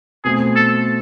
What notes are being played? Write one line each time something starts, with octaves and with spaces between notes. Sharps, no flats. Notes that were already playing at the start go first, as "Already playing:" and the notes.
B2 A3 C4 G#4
A4